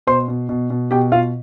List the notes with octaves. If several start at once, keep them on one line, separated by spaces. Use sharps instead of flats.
B2 C5 C6
B2
B2
B2
B2 G4 G5
B2 F4 F5